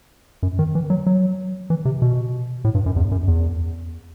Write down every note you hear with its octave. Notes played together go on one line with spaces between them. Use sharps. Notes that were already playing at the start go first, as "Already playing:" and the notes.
F#2
D#3
E3
F#3
F#3
E3
C3
B2
A2
G2
F#2
E2
F#2
E2